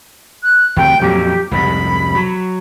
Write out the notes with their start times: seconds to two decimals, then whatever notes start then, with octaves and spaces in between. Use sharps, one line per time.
0.43 F#6
0.76 D2 C3 G5
1.01 F2 A#2 F#3 G4
1.51 C2 F2 G#2 B5
2.15 F#3